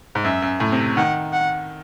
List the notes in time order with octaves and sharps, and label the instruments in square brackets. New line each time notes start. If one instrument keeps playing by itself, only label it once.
[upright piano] G#2
[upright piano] F#2 [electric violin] E5
[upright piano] F#2
A2
C3
[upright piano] D#3 [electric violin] F#5
[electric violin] F#5